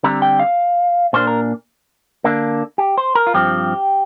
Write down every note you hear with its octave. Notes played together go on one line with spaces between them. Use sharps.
D3 G3 C4 A#5
G5
F5
A#2 A#3 D4 C5
A#4
D3 A#3 D4
G4
C5
A#4
F4
G2 F3 C4 G4